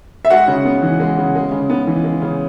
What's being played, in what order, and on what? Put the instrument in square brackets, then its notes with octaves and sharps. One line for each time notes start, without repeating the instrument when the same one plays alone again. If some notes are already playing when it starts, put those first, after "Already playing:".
[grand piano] E5
G#3 F#4 F#5
C#3
B3
E3
G#3
C#3
G#3
C#3
B3
E3
G#3
C#3